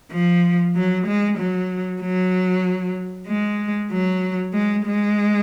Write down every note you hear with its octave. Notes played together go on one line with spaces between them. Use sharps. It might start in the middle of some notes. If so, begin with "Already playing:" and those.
F3
F#3
G#3
F#3
F#3
G#3
F#3
G#3
G#3